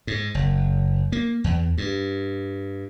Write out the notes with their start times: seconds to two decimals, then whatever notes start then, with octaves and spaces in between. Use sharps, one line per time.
0.07 G#2
0.35 F#1
1.12 A#3
1.44 E2
1.78 G2